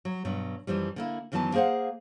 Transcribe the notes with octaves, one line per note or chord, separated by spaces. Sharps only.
F#3
G2 B2 F#3
F#2 E3 F3 G3
D3 A#3 E4
F#2 D#3 E3 F#3 B3 A5
A#3 G#4 C5 F5 F#5